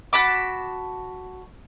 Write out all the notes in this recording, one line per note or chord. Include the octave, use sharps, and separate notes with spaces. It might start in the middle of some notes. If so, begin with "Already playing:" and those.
F#4 A5 B5 D6